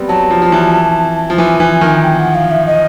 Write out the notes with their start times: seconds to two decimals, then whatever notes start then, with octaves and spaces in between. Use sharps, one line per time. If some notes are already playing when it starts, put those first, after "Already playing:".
Already playing: G3 B3 C4
0.09 F#3 A5
0.30 F3
0.42 F3
0.52 E3
1.30 F3
1.38 E3 G#5
1.60 E3
1.81 D#3
2.03 G5
2.19 F#5
2.35 F5
2.51 E5
2.67 D#5